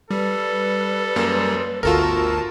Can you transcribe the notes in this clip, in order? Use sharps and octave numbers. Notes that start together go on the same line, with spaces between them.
G3 A4 B4
F#2 A#3
G1 D2 F4 F#4 A4 A#4 A5